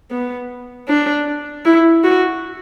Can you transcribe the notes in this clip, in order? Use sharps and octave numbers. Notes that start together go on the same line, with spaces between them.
B3
D4
E4
F#4